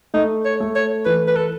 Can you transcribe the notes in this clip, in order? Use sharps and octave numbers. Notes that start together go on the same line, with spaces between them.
A3 D#4
C#5
A3
C#5
E3 B4
B4
A4